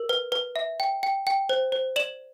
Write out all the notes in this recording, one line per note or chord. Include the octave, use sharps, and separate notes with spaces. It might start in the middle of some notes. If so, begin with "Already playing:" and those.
Already playing: A#4
B4
B4
E5
G5
G5
G5
C5
C5
D5 E7 F#7